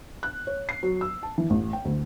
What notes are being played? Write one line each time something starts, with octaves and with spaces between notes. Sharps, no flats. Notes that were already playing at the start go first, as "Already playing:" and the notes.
F#6
C#5
C7
F#3
E6
A5
E3
A1
G5
D2